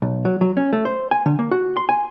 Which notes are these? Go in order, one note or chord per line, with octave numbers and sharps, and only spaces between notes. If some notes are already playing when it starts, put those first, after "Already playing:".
B1
F#3
F#3
C#4
A3
C5
G#5
D3
A#3
F#4
C6
G#5